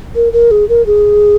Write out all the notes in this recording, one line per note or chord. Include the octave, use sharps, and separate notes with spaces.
A#4
A#4
G#4
A#4
G#4